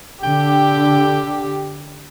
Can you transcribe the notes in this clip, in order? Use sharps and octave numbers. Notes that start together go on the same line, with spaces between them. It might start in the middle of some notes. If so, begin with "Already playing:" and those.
D3 G4 G5